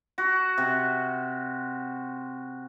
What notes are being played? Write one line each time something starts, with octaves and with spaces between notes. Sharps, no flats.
F#4
C3